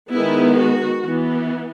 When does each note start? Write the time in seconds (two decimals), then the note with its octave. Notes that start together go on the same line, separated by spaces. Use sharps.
0.12 D#3 G#3 B3 E4
0.59 F#4
1.04 E3 B3